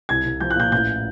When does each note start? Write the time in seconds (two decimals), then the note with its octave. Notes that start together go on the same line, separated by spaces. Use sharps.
0.09 C2 G#6
0.25 C2
0.40 F3 G6
0.51 F#6
0.56 A#2 G6
0.72 A1 G6